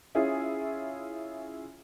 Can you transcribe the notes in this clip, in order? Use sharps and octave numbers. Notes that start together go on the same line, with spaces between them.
C#4 E4 F4 G#4